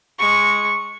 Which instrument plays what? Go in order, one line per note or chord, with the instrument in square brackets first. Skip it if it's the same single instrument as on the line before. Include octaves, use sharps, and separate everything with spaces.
[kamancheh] G#3 C#6